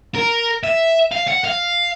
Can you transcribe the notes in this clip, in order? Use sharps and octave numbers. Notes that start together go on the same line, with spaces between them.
A#4
E5
F5
F#5
F5